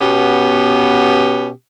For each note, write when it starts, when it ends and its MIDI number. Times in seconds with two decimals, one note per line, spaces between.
0.01 1.49 47
0.01 1.49 59
0.01 1.49 61
0.01 1.49 67